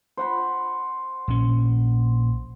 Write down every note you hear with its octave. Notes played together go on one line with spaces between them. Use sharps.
C5 F#5 B5
A#1 C#4